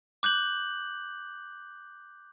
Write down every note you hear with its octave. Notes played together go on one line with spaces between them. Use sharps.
D6 F#6 G6 F#7